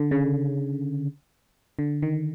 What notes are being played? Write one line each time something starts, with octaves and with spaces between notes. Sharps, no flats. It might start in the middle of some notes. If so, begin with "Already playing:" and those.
Already playing: D3
C#3
D3
D#3